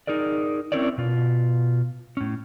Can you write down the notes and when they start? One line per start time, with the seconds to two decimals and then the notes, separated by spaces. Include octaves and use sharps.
0.07 D#4 G#4 A#4 D5
0.72 C4 C#4 E4 A#4 C#5 D5
0.98 B2 F4
2.17 A2 C#4